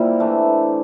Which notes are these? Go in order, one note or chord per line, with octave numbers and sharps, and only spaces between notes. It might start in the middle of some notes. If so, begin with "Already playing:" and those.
Already playing: A#2 G3 A#3 C4 E4
E3 A3 D4